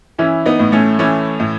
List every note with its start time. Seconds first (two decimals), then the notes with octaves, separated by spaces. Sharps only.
0.18 E3 C#4 E4
0.46 B3 D#4
0.59 A2
0.72 A3 C#4
0.99 E3 A3 C#4
1.40 A2